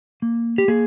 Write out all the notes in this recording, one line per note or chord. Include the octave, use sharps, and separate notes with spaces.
A#3
G4
A#3 G#4